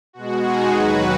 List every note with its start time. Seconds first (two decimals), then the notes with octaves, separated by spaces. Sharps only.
0.13 B2 G#3 F#4
0.43 D#4 G#4
0.71 D#2 D#3 F#3 F#4 B4